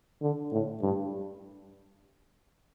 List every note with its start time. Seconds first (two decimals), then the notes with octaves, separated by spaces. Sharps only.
0.22 D3
0.51 A2
0.82 G2